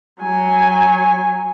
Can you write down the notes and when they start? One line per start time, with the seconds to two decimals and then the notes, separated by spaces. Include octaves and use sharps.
0.22 F#3 G#5